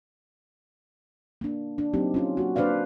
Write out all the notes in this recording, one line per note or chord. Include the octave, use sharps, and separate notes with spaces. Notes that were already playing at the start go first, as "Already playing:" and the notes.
A#3 D4
D4
F#3 A#3 C4 D#4 G4
C#4 F4
A#3 F#4
A#3 D4 B4 C5 D5 F5